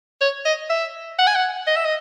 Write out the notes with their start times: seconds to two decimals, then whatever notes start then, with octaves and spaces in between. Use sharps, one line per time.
0.21 C#5
0.45 D#5
0.70 E5
1.19 F#5
1.27 G#5
1.35 F#5
1.67 D#5
1.76 E5
1.85 D#5